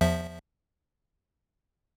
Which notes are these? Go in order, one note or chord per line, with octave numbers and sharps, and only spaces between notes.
E2 F3 E5